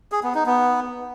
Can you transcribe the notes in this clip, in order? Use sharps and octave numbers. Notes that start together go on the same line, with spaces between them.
G#4
B3
D#4
B3